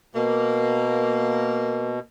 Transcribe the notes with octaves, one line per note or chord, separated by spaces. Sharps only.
B2 A#3